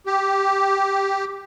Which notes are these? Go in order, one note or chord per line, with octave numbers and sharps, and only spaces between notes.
G4